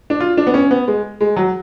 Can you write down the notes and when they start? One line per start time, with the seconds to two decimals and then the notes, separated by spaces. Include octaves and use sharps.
0.10 D4
0.20 F4
0.37 D4
0.47 B3
0.54 C#4
0.71 B3
0.88 G#3
1.21 G#3
1.36 F#3